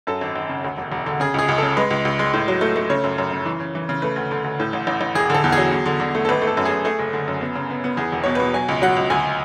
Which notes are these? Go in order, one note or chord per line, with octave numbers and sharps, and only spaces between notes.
F#2 A4
G#1
G#1
C#3
D2
E1
E1
D3
C#3 G#4
C#2 G#4
C#2
C#3 A4
G#3 B4
C#2
C#2
G#3
A2
F#3
A3
A3
C#3 C#5
F#2
F#2
C#3
E3
C#3
E3
C#3
A3 B4
D2
D3
D2
A2
A1
A1
A1
E1 G#4
D3 A4
E2
G#4
F#3
E2
D3
D3
A3
A4
G#1 B4
A3
A4
F#2
G#4
F#2
A3 G#4
F#1
D3
F#2
B3
C#3
B3
B3
E2 G#4
E1
B2 C#5
B2 B4
F#3 G#5
C#2
F#3 F#5
C#2
D2 G#5